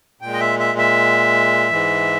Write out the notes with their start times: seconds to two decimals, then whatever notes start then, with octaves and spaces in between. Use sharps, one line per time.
0.21 A#2 G#3 G5
0.33 D#5
0.40 E5
0.59 E5
0.78 E5
1.71 G#2 E3 G#3